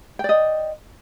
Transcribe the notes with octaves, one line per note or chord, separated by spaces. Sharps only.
D5 D#5 G5